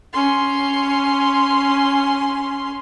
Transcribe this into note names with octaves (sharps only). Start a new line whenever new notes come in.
C#4 C6